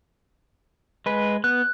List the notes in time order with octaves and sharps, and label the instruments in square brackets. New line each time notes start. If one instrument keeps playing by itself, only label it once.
[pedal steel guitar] G#3 B4
[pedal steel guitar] B3 [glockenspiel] F#6